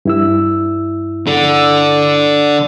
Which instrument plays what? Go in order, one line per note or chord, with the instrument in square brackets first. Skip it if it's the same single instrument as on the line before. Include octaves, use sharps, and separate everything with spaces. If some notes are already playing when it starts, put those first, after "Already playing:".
[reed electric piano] G2 E4 E6
[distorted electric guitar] D3